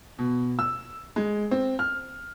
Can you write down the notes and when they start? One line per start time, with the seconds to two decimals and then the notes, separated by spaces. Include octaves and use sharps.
0.19 B2
0.59 E6
1.16 G#3
1.51 C4
1.79 F6